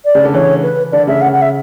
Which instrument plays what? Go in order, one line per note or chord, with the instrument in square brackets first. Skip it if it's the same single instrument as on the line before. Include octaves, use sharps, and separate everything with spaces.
[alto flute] D5
[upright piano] C#3
D3
[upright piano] E3 [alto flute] C#5
[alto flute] B4
[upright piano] D3 [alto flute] D5
[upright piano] C#3 [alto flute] E5
[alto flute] F#5
[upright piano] C#3
[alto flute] F#5
E5